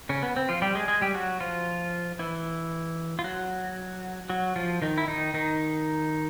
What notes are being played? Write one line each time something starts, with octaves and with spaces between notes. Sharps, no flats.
C#3 C#4
B3
C4
F3 F4
G3 G4
G#3 G#4
G#3 G#4
G3 G4
F#3 F#4
F3 F4
E3 E4
F4
F#3 F#4
F#3 F#4
F3 F4
D#3 D#4
E4
D#3 D#4
D#3 D#4